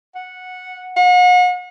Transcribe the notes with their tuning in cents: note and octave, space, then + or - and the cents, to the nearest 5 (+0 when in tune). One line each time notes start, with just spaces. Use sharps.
F#5 -10
F#5 -40